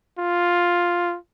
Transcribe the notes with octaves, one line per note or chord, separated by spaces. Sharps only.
F4